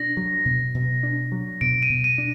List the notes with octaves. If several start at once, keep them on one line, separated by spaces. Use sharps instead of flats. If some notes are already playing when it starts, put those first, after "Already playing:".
Already playing: B2 D4 A#6
F#3
B2
B2
D4
F#3
B2 D7
D#7
B2
D#7
D4